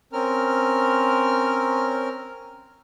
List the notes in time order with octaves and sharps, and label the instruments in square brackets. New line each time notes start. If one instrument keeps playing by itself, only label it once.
[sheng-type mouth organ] C4 C#4 A#4 F6